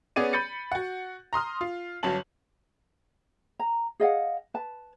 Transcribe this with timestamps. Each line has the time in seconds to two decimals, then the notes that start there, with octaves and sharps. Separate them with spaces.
0.16 B3 C#4 G#4 D5 D#7
0.33 B5 G6 A6 C#7
0.72 F#4 F#5
1.33 A#5 C6 D#6 F6
1.61 F4
2.03 G1 F#3 C#4 A5 F#7
3.59 A#5
4.00 G#4 D#5 F5 F#5
4.54 B4 A5